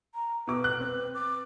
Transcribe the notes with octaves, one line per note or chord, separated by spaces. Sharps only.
A#5
B2 B4 D6
F#6
C4 B4
D6